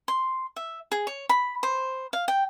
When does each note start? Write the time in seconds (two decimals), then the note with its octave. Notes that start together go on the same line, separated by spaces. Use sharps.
0.08 C6
0.56 E5
0.92 G#4
1.07 C#5
1.29 B5
1.63 C5
2.13 F5
2.28 G5